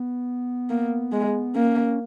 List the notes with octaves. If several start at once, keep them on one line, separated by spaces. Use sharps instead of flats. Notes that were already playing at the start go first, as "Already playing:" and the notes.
Already playing: B3
A#3
G#3
A#3 C#4